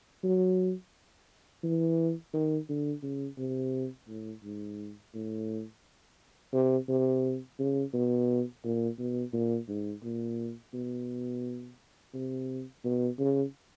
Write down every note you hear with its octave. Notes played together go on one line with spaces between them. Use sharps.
F#3
E3
D#3
D3
C#3
C3
A2
G#2
A2
C3
C3
C#3
B2
A#2
B2
A#2
G#2
A#2
B2
C3
B2
C#3